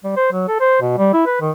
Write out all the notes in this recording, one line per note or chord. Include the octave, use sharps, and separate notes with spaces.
G3
C5
F#3
A4
C5
B2
G3
E4
B4
D#3